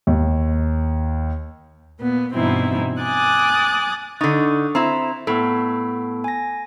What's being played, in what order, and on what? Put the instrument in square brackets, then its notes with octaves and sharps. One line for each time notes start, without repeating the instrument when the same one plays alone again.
[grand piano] D#2
[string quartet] A#2 B3
G2 B2 E3 C4 D#4 E4
G#5 D6 D#6 F#6 A6
[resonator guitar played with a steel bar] D3 D#4 [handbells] C#6 D#6 A6
[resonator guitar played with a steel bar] C4 E4 [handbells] A#5
[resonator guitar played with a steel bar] A2 [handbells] B3 A4
[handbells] G#5 A#6